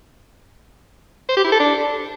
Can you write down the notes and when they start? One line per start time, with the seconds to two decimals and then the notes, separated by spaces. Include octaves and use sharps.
1.29 C5
1.36 G4
1.44 E4
1.52 A4
1.59 D4